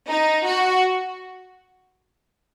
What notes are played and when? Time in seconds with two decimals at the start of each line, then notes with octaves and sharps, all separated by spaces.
0.10 D#4
0.46 F#4